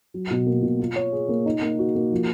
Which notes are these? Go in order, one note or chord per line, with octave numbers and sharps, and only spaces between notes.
F#3
B2
A#3
B2
F4
C#5
G#4
A#3
D#4
A#3
F#4
A#3
F3